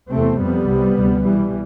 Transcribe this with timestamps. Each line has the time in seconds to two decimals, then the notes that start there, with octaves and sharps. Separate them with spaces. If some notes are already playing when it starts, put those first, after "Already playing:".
0.11 E2 C3 A3 C4
0.39 F2 C3 G3 B3
0.68 C2 C3
0.96 D2 C3
1.24 C2 B2 E3 G3